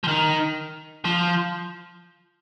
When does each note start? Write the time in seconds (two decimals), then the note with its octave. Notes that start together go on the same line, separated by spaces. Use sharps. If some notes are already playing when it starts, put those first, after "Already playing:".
0.04 F3
0.08 D#3
1.05 F3